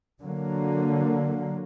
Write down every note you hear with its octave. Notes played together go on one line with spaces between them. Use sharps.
D3 F#3 A#3